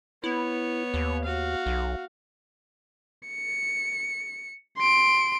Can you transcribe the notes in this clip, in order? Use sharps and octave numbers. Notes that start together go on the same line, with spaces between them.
B3 E4 C#5
D#2
F#4 F5
B1
C#7
C6 D7